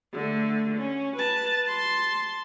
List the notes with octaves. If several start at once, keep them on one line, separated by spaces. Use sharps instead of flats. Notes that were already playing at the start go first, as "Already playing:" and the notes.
D3 A3
C#4
B4 A5
A5 C6